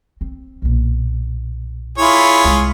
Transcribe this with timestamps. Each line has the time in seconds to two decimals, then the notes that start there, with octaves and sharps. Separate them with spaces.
0.21 C4
0.62 B1 A#2
1.98 E4 F4 G#4 C#5
2.45 C2 G#3